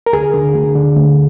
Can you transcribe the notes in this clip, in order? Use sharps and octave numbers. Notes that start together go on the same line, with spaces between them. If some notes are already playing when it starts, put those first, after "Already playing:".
A#4
D2 G#4
D3
D2
D3
D2